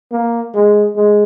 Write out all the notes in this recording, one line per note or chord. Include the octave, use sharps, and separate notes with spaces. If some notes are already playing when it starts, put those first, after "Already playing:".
A#3
G#3
G#3